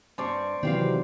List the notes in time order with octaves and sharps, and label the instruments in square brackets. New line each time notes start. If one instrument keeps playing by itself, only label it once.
[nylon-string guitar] G2 C4 [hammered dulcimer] C5 D5 C#6
[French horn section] C3 E3 F#3 [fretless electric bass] D#3 [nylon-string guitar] C4 G4 F5